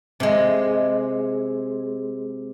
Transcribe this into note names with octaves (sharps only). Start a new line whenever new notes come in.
C3 G#3